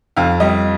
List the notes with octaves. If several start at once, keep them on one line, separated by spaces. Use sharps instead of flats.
F2 F5
G3 D#5